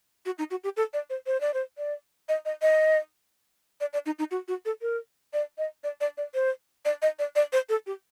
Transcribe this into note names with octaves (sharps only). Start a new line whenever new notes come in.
F#4
D#4
F#4
G4
A4
D5
C5
C5
D5
C5
D5
D#5
D#5
D#5
D5
D5
D#4
D#4
F#4
F#4
A4
A#4
D5
D#5
D5
D5
D5
C5
D5
D#5
D5
D5
C5
A4
G4